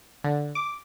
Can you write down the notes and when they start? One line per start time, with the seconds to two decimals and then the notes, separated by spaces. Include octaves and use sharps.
0.24 D3
0.55 D6